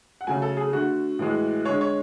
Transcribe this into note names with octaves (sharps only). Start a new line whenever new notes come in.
F#5
C#3 F#3 A3 G#5
A4
G#4
D3 A3 F#4
A2 E3 G#3
D3 G#3 C#5
C#5